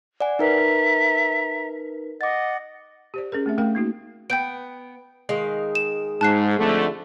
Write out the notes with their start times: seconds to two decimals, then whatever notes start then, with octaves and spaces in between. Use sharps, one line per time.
0.20 D5 F#5 G#5
0.39 D#4 A#4 B4 E5 A#5
2.21 D#5 F#5 D6 A6
3.14 G4 C5 D5
3.32 C#4 G#4 A#4
3.46 A3 C4 E5
3.58 A3 C#4 A#4 F5 G5
3.75 A#3 D#4 F#4
4.30 B3 G5 G6 D7
5.29 D#3 G#3 F5
5.75 E7
6.21 G#2 A5 F#6 C7
6.58 F2 D3 A3